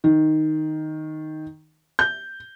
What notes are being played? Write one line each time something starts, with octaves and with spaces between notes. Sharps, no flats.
D#3
G6